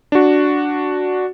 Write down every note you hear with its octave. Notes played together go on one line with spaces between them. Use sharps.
D4 F#4